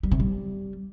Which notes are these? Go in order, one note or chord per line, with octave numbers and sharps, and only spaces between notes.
G3
C3
G3